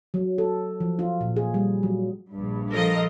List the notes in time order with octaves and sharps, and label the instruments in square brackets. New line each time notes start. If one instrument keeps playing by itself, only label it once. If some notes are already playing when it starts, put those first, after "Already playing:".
[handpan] F#3
A4
F3
F4
A#2
G#4
G3
F#3
[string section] A#1 G2
[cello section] F3 F4 A#4 [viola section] A4 D#5